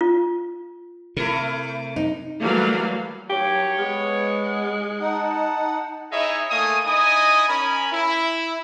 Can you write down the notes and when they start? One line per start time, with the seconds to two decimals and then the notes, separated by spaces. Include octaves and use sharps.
0.01 F4
1.17 C3 A3 E4 A#4
1.96 D#4
2.41 E3 F#3 G3 A3 A#3 F5
3.30 F#3 G4 C#5
3.78 G#3 B3
5.01 D#4 F#5 A5
6.12 D#4 E4 G#4 C#5 D#5 E5
6.51 A3 A#3 F5 G#5 D#6
6.85 D#4 E4 D#5 G#5 D#6
7.49 C#4 A#4 G#5 B5
7.92 E4